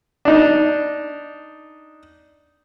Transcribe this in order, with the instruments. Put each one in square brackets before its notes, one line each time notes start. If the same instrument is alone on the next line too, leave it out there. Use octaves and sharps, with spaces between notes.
[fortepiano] D4 D#4